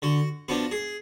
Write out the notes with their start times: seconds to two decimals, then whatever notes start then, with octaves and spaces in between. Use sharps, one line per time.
0.02 D3 F#4
0.48 F3 B3 D4 F#4
0.71 G#4